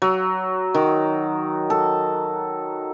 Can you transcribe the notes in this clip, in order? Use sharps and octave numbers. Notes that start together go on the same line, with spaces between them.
F#3
D#3
A4